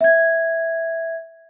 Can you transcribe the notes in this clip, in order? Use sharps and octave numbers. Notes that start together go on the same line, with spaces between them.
E5 G#6